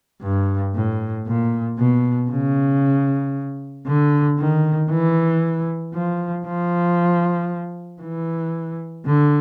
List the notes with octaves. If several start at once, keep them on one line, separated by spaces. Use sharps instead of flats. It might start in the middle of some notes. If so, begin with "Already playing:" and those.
G2
A2
A#2
B2
C#3
D3
D#3
E3
F3
F3
E3
D3